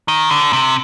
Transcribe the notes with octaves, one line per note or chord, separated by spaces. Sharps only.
D#3
D3
C3